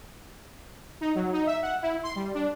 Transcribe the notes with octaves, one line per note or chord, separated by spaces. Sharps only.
D#4
F#3
D#4
E5
F#5
E4
C6
G3
D4